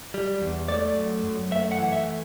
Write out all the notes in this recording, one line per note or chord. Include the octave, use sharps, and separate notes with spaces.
G3
E2
A3 D5
F#2
F#2
A3 E5
F#5
E3
E5